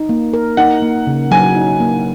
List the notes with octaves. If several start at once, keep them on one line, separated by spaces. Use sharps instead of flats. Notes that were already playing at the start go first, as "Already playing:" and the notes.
Already playing: D#4
A#3
A#4
D#4 F#5
A#3
C#3
F#3 G#5
D#4
A#3